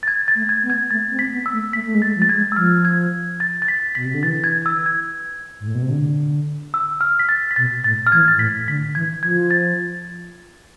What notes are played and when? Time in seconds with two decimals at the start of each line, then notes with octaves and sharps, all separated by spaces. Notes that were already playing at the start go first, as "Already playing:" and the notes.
0.03 A6
0.08 G#6
0.28 A6
0.35 A3
0.49 G#6
0.63 B3
0.70 G#6
0.91 A3 A6
1.11 C4
1.19 B6
1.32 B3
1.46 E6
1.53 A3
1.73 A3 B6
1.84 A3
1.95 G#3
2.02 A6
2.16 F3
2.22 A6
2.29 G#6
2.36 G#3
2.52 E6
2.56 F3 F6
2.85 G#6
3.40 A6
3.62 A6
3.68 B6
3.95 B2 B6
4.05 C3
4.14 D3
4.23 E3 A6
4.44 G#6
4.66 E6
4.86 G#6
5.60 G#2
5.67 A2
5.75 B2
5.82 C3
5.90 D3
6.74 E6
7.01 F6
7.19 B6
7.29 A6
7.51 B6
7.56 B2 A6
7.84 A2 A6
8.07 F6
8.12 E3 G#6
8.28 A6
8.36 G#2
8.39 A2 B6
8.68 D3 B6
8.95 E3 G#6
9.23 F3 G#6
9.51 A6